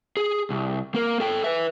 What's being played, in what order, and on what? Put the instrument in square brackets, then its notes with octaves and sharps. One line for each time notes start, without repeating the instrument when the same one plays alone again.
[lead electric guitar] G#4
C2
A#3 A#4
A4 G5
B4 E5